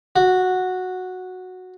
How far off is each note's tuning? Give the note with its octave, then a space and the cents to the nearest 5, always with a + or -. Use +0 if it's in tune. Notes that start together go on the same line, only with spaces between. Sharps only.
F#4 -5